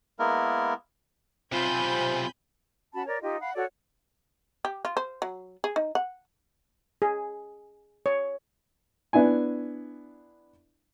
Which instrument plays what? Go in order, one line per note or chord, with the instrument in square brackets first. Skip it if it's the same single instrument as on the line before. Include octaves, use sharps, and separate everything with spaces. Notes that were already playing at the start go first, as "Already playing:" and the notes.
[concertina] G#3 A#3 B3 E4 A#4
[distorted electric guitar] B1 C3 [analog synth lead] C4 [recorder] F4 [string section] G#5 B5 G6
[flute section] C#4 F#4 A5 B5
A#4 C#5 D5
D#4 F4 G4 D#5
F5 F#5 B5
F#4 A4 C#5 D5
[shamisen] G4
F4
C5
F#3
G#4
D#4
F#5
[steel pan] G#4
C#5
[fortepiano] B3 D4 E4 G#5